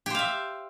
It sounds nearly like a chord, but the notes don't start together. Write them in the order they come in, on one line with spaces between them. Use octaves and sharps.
G4 C5 F5 E5